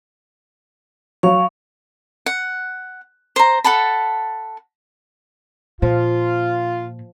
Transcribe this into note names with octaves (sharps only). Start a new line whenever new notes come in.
F#3 F5 C#6
F#5
C5 A#5
A4 F#5 A5 B5
A#2 F3 F4